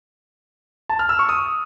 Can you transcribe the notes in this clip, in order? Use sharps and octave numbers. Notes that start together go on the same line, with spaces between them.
A5
F6
E6
C#6
D#6